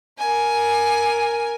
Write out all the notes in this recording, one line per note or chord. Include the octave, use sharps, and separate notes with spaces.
A#4 G#5